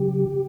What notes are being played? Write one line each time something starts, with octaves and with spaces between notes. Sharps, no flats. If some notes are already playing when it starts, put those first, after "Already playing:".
Already playing: C#3 F#3 G4